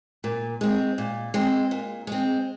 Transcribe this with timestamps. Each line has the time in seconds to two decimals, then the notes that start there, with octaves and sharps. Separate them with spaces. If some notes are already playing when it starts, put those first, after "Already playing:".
0.24 A#2
0.61 G#3 C4
0.98 A#2
1.34 G#3 C4
1.71 A#2
2.07 G#3 C4